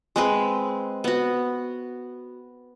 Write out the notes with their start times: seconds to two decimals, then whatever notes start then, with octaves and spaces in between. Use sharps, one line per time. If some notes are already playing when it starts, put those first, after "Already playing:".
0.16 G#3 C4 B4
1.04 B3 F#4